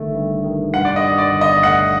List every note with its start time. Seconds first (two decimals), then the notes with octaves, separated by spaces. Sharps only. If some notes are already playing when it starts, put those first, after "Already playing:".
Already playing: G1 G2 D#3 A3
0.14 G2
0.43 D#3
0.73 G2 F#5
0.85 D5
0.96 D#5
1.04 D#3
1.18 D5
1.33 G1
1.41 D#5
1.63 A3 F#5